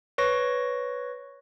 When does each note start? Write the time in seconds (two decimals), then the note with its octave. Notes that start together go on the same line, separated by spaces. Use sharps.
0.18 B4 C#5 C#6 A#6